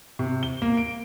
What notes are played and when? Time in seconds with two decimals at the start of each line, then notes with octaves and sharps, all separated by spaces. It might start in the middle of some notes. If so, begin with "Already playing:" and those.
0.19 C3
0.43 G7
0.62 A#3
0.77 D7